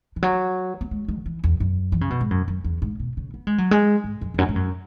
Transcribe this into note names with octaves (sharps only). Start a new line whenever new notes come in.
E3
F#3
B3
G#3
G#3
C#3
E3
E2
F#2
E3
C#3
B2
G#2
F#2
F#2
E2
G#2
B2
C#3
B3
G#3
F#3
G#3
G#2
F#2
E2
F#2
G#2
F#2